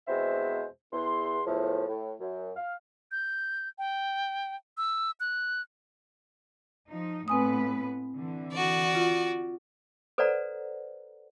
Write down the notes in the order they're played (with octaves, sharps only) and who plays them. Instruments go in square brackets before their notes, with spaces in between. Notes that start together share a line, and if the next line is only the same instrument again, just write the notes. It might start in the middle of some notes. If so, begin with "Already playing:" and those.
[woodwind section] E2 B2 G#3 C4 C5 E5
E2 C6
E2 A2 F3
A2
F#2
F5
[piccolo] G6
G5
E6
F#6
[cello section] F3 D#4
[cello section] A2 B3 B4 [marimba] C4 G#5 D#6
[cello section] D3 E3
[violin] F#4 D5
[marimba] F4
[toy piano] A4 B4 C5 D5 F#5 A#5